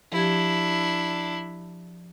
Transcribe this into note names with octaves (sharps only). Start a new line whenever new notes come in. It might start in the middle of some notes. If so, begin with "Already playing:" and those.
F3 D4 E4 G4 G#6